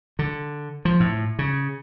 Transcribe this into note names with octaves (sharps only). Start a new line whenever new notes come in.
D3
F3
A2
C#3